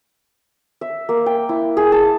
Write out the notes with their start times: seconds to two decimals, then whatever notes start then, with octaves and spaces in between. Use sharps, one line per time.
0.81 E5
1.09 A#3
1.26 G5
1.49 E4
1.77 G#4
1.92 A5